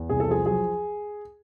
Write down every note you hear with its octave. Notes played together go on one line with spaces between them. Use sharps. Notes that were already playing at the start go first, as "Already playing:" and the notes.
Already playing: E2
C2 G#4
A4
F3 G#4
F#3 G#4